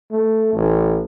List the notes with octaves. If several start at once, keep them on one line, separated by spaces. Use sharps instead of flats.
A3
A1